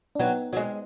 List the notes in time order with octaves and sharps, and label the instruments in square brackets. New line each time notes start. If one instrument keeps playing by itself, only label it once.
[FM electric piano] D4
[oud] F#3 [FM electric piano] B3 D#4
[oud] F#3
G#3